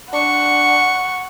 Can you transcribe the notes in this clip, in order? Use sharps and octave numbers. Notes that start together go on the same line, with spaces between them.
D4 F#5 C#6